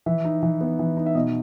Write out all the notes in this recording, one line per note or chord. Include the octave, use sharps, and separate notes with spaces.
E3 E5
D#4
E3
B3
E3
D#4
E5
B2 D#5